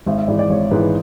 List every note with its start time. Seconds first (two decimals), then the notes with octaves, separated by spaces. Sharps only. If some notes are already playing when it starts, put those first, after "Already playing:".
0.06 G#1 E5
0.17 E5
0.28 G#2 E3 D5
0.39 D5
0.50 G#1 C#5
0.71 G#2 B4
0.74 E3
0.82 B4